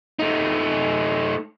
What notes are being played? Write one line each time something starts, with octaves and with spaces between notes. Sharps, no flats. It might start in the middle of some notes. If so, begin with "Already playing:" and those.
A3 D#4